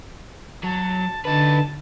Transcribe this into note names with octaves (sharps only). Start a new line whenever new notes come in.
F#3 A5
D3 D#4 B4 A5